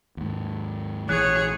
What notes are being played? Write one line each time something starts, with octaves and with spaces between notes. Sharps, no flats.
D#2 G#2
A#1 E3 G#4 C#5 F#6